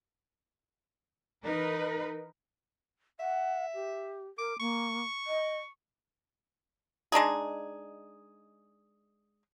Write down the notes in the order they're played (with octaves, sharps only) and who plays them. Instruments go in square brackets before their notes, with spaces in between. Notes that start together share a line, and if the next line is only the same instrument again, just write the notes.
[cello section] E3 D#4 A#4 B4
[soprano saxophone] E5 [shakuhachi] F#5
[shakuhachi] G4
[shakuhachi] A#4 [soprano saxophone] D6
[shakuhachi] A#3 [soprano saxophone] C#6
[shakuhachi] D#5
[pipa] G#3 D4 D#4 G#4